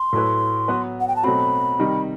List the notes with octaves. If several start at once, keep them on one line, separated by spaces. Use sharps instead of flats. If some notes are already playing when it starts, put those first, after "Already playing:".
Already playing: C6
A2 F#3 A3 E4 B4
F#3 B3 F#4 B4
F#5
G5
A5
B2 F#3 A3 C4 F#4 B5
C3 D#3 G3 D#4